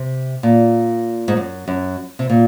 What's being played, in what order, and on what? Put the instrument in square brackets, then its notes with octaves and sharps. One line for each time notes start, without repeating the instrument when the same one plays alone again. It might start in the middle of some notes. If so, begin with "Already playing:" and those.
Already playing: [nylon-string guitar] C3
A#2
G#2
F#2
F#2
C3
A#2